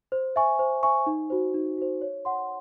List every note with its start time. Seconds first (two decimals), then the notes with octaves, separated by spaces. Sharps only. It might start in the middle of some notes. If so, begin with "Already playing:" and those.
0.12 C5
0.36 E5 G#5 C#6
0.59 C5
0.83 E5 G#5 C#6
1.07 D#4
1.30 F#4 C5
1.54 D#4
1.78 F#4 C5
2.01 C#5
2.25 F#5 C6